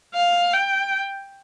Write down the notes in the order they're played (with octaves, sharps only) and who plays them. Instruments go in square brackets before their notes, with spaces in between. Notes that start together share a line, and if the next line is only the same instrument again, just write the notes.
[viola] F5
G5